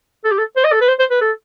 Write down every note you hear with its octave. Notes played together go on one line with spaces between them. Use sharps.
A4
G4
A4
C5
D#5
A4
B4
C5
C5
B4
A4